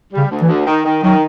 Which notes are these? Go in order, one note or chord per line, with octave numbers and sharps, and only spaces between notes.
G3
C#3
D2
E3
D2
D#3
D#3
D#3 F#3